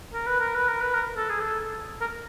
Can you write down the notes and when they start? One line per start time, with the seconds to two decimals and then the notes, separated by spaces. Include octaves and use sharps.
0.14 A#4
0.27 B4
0.40 A#4
0.55 B4
0.68 A#4
0.81 B4
0.94 A#4
1.17 A4
1.29 G#4
1.40 A4
2.01 A#4